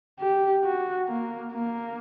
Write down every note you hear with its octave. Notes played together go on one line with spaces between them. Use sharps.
G4
F#4
A#3
A#3